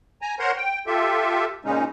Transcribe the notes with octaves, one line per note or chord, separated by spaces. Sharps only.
G#5 A#5
A#4 C5 C#5 F#5 A#5 C6
G5
F4 G4 A4 E5
A#2 C#3 G#3 C#4 D#4